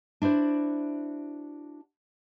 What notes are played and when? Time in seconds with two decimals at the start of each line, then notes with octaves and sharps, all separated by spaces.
0.22 D4 E4 F#4 C5 D5